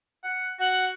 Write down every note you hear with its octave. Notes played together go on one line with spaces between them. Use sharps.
F#5
F#4 F#5